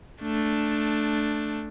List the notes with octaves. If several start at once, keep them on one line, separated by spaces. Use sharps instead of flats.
A3 D4